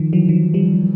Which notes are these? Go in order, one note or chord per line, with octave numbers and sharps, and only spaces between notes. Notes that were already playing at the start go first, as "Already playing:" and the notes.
Already playing: D#3 F3
E3 F#3
D#3 F3
F3 G3